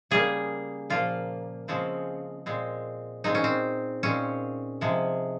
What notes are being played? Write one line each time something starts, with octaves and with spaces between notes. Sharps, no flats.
C#3 G3 A#3 G#4
A#2 F3 A#3 F4
C#3 F3 G#3 C4
A#2 G#3 C4
A#2 G#3 C4 D#4
C#4
C4
A#2 G#3 C4 C#4
C3 F3 G#3